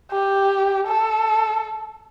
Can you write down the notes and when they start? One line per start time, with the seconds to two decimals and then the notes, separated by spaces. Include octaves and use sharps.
0.11 G4
0.87 A4